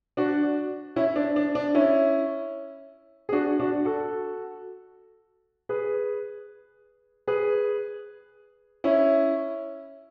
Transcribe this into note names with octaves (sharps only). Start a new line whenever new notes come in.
D4 F#4
C#4 E4
D4
D4
D4
C#4 E4
G#4
D4 F#4
D4 F#4
F#4 A4
G#4 B4
G#4 B4
C#4 E4